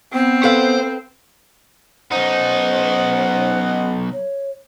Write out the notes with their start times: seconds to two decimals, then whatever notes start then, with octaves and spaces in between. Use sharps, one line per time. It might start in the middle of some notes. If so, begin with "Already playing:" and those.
0.13 B3 C4
0.43 A4 B4 C5 F5
2.12 B1 C#4 D#4 C5 D#5 F#5
4.13 C#5